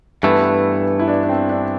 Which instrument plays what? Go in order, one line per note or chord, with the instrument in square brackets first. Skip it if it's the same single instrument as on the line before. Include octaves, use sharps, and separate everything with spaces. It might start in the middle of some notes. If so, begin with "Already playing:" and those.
[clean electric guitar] G2 E3 A3 [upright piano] B3
[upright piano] E4
D4
D4
C4
D4